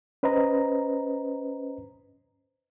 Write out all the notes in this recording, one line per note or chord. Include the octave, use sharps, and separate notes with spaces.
C#4 B4 C5 D#5 A#5